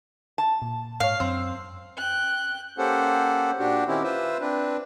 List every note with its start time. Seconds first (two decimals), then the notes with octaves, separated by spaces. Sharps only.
0.38 A5
0.62 A#2
1.00 G#2 C#5 F5
1.20 F#2 C4 E6
1.97 G5 F#6
2.78 A#3 C#4 G4 A4 C5 F#5
3.59 A#2 D4 F#4 G4
3.88 D#3 C4 C#4 E4 G4
4.04 F4 B4 C5 E5
4.41 C4 D4 B4